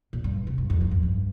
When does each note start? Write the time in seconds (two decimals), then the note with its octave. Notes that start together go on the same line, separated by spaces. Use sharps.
0.13 A#2
0.24 G2
0.47 C3
0.58 G2
0.70 F2
0.81 G2
0.91 F2
1.03 G2